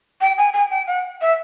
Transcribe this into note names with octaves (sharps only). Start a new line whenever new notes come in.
G5
G#5
G#5
G5
F#5
E5